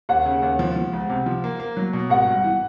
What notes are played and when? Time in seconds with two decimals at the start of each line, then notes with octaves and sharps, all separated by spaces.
0.09 D#2 F#5
0.25 C#3
0.43 D#2
0.59 F3
0.76 F3
0.93 C#2
1.10 C3
1.26 F3
1.44 A#3
1.60 A#3
1.77 F#3
1.93 B2
2.10 G#1 F#5
2.26 G2
2.44 E3